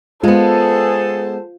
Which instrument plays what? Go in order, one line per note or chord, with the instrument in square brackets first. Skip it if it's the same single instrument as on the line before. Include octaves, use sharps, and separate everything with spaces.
[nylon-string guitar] G#3 B3 [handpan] F4 [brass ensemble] G#4 A4 A5 [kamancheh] C5